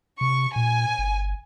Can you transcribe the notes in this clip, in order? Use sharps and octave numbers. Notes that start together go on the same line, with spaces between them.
C3 C#6
A#2 G#5
G1